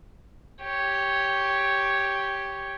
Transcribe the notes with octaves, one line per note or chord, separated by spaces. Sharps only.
G4 C#5